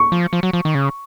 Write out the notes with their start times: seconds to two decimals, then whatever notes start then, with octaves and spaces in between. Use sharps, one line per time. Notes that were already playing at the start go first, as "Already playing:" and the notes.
Already playing: C#6
0.12 F3
0.33 F3
0.43 F#3
0.53 F3
0.65 D#3
0.75 C#3